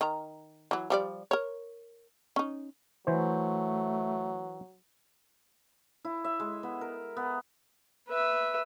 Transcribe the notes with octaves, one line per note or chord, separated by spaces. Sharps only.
D#3 A#5
E3 F#3
F3 G3 D5
A#4 C#5
C#4 D#4
E3 F#3 A3 C5
E4
E5
G#3
B3
A#4
B3
B4 E5